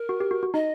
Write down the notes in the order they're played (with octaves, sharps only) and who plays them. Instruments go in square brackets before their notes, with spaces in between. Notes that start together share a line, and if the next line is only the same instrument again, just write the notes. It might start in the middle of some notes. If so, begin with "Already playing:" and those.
Already playing: [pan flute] A#4
[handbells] F#4
G4
F#4
F#4
[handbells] D#4 [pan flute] D#5